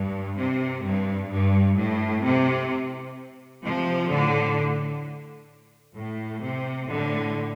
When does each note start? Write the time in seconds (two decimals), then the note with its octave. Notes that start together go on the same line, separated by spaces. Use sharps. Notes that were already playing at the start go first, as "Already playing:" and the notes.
Already playing: G2
0.37 C3
0.84 G2
1.29 G2
1.77 A2
2.24 C3
3.63 C3 F3
4.09 A2 D3
5.96 A2
6.41 C3
6.88 A2 D3